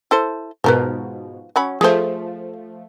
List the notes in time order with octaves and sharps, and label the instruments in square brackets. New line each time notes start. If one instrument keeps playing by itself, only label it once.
[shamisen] E4 A4 C5
[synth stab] G#2 B2 [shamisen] F3 A#4 B4
[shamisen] F#3 C#4 B5
[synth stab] F3 A3 [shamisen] G#4 C5